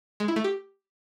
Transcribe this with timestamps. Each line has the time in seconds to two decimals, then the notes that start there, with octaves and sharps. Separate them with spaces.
0.20 G#3
0.28 E4
0.36 A3
0.44 G4